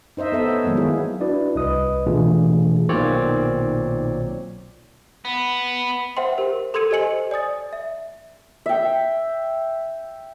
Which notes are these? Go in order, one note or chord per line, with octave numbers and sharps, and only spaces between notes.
D#4 C5 D#5 E5
B3 A4 E5
C#5
D#3 F#3 G#3 A#3 B3
B3 E4 G#4
D4 E4 F#4 B4 D5
C2 B4 D#5 D#6
B2 E3 A3 D4 F4 G#4
B1 A#2 D#3 C4 C#5 D5
B3
C5 E5 F#5 G5 C6
G4 A#4
A4 C6 E6 G#6 C#7 D#7
G4 C5 D#5 G#5 C#7 F#7
D5 G#5 D#6 A6
E5
E5 G5